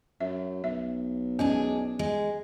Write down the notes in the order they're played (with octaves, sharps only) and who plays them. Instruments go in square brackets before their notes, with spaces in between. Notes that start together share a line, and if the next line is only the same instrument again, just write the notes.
[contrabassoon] F#2 [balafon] E5
[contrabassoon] B1 [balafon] E5
[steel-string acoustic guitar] G#3 D4 G#4 [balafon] C#4
[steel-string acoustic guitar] G#3